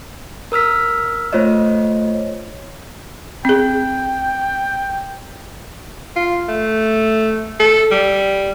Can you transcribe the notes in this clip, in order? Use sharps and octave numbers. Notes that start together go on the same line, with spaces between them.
A#4 E6 F6 B6
A3 F4 C5 C#5 D#5
C4 G#4 G5
F4
A3
A4
G3